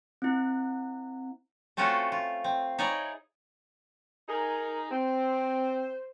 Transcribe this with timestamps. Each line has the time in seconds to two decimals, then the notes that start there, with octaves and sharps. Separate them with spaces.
0.22 C4 E4
1.77 A3 C4 C#4 F4 F#4 A4
2.12 F4
2.44 C4
2.79 D#4 E4 G#4 C#5 D5
4.29 D#4 G#4 A#4
4.91 C4 C5